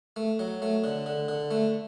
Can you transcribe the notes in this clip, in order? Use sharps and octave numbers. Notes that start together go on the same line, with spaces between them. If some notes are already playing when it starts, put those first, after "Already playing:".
A3
F#3
A3
D3
D3
D3
A3